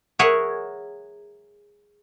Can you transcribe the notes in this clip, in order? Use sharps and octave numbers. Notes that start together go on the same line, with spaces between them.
G#4 A#4 C#5 E5 F#5 G#5